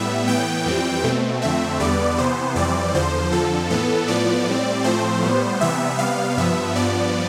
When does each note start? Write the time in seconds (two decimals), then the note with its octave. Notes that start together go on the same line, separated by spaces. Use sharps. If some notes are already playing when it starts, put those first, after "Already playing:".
Already playing: A2 G3 B3 E5
0.27 A2 E3 B3 G5
0.66 F2 E3 G3 C4
1.03 B2 A3 C4
1.42 F2 D3 A3 C4 E5
1.80 E2 D3 G3 B3 D5
2.18 C3 E3 B3 C5
2.55 F2 E3 G3 C4 D5
2.94 E2 D3 F3 C5
3.32 F2 D3 F3 A4
3.70 A2 E3 B3 A4
4.08 A2 F3 B3 D5
4.47 A2 G3 C4
4.84 A2 F3 A3 C4 C5
5.22 A2 G3 B3
5.61 C3 E3 G3 B3 E5
5.98 C3 G3 B3 F5
6.37 G2 F3 B3 E5
6.75 G2 F3 B3 D5